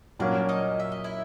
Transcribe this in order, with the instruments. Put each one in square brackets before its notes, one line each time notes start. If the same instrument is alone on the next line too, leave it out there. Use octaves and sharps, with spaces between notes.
[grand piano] A#2 F#3 A#3 C#4 [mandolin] D4 D5
[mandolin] D#4 D#5
E5
D#5
E4 E5